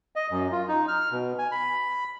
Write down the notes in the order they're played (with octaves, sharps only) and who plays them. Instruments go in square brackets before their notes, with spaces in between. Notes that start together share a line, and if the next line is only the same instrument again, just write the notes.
[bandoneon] D#5
F#2
F4
D#4
F6
B2
G#5
B5